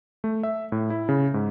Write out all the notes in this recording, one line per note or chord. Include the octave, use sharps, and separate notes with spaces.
A3
E5
A2
E4
C#3
G#2